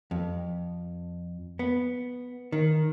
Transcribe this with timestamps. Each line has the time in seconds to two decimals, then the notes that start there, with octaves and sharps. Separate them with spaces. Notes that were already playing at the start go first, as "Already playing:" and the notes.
0.11 F2
1.59 B3
2.52 D#3